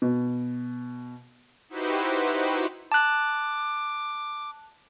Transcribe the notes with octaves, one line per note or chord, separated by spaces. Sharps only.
B2
D#4 E4 F#4 G4 B4 C5
A5 D6 F#6